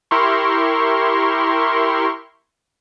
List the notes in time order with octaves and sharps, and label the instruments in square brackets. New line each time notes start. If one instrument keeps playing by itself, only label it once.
[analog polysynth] E4 G4 A#4 C6 C#6